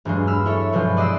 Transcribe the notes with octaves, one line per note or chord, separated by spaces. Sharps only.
E1 G2 F#3 G#3
B5 E6 F6
E4 A4 C#5
G2 B2 F3 F#3 G#3 F4
D5 D#5 F#5 B5 C6 E6